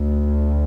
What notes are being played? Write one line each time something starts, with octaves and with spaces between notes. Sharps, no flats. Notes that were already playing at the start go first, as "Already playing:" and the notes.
Already playing: D2